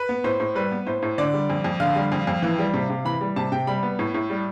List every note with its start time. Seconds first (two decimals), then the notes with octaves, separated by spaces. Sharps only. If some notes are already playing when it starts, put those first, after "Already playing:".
Already playing: B4
0.09 B3
0.24 A2 C5
0.40 A2
0.55 G3 B4
0.71 B3
0.86 A2 C5
1.02 A2
1.18 D3 D5
1.33 G3
1.50 F2
1.64 F2
1.80 D3 F5
1.95 G3
2.12 F2
2.27 F2
2.42 E3
2.59 G3
2.74 C3
2.90 C3
3.05 E3 B5
3.21 G3
3.36 C3 A5
3.52 C3 G5
3.67 G3 B5
3.83 B3
3.99 A2
4.14 A2
4.30 G3